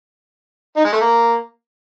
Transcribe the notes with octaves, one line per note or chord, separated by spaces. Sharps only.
D#4
G#3
A3
A#3